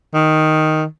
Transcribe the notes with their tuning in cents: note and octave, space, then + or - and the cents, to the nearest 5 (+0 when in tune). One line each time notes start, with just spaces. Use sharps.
D#3 +0